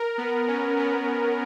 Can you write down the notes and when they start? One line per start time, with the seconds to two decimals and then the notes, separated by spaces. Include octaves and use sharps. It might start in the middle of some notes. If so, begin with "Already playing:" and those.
Already playing: A#4
0.18 B3
0.48 C#4
0.78 B3